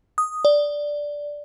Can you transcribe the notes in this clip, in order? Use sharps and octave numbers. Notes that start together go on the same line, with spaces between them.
D#6
D5